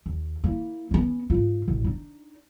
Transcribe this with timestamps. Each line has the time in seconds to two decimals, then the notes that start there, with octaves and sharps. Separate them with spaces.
0.06 D#2
0.44 A#3 E4
0.91 B3 C#4
1.30 G#2 F4
1.68 A1 B2
1.84 D4 D#4